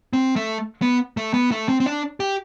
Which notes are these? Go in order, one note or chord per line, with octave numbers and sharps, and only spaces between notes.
C4
A3
B3
A3
B3
A3
C4
C4
D4
G4